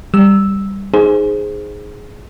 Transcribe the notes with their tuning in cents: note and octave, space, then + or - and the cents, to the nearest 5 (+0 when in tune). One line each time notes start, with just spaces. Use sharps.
G3 +5 E6 -5
D#4 +0 G#4 +0 C5 -5